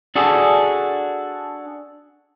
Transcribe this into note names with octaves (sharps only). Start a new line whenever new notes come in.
D4 F#4 G#4 A4